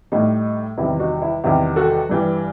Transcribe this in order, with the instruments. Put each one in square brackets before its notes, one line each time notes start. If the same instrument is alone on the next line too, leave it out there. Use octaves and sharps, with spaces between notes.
[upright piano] A2 G3 D#4
E2 C3 D#3 G3 E4
D#4 F#4
E4
E2 C3 D#3 G3 E4 G4
F#4 A4
G2 E3 G3